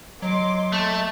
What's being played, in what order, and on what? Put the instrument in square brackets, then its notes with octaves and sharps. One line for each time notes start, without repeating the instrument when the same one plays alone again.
[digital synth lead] F#3 [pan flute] D#5 [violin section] C6 D6
[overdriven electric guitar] A3